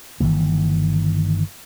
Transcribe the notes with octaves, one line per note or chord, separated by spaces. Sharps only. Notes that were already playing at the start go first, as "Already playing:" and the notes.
G1 D#3 E3 A#3